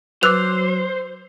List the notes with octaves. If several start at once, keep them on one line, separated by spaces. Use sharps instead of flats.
F#3 B4 C5 D6 E6 F#6 F7